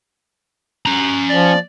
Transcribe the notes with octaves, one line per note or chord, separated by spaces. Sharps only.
C#4 A#5
F3 D5